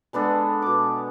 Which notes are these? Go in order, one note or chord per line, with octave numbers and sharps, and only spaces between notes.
G#3 B3 D4 A4
B2 D6